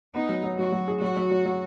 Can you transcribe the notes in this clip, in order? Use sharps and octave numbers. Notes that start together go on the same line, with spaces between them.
B3 D#4
F#3
F#3
F#3 F#4
F#3
G#4
F#3 F#4
F#3
F#3
F#3